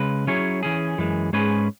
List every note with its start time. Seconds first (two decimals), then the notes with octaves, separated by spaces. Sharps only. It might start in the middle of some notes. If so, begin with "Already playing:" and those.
Already playing: C#3 G#3 B4
0.27 F#3 C#4 E4 G#4 C#5
0.63 E3 C#4 G#4
0.98 F#2 E3 G#3
1.33 G#2 G#3 C#4 G#4 B4